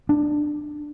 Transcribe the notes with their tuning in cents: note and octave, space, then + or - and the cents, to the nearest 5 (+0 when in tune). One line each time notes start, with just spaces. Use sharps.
D4 +10